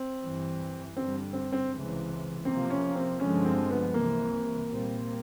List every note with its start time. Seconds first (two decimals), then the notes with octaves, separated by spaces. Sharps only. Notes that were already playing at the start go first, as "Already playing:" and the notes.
Already playing: C4
0.22 G2 E3 G3
0.96 G2 D3 G3 C4
1.33 C4
1.52 C4
1.70 C#2 C3 E3
2.45 C3 F3 A#3 C4
2.70 C#4
2.95 C4
3.20 G2 D3 F3 G#3 C#4
3.45 C4
3.70 B3
3.94 C2 C3 E3 A#3
4.69 A#2 G3 C4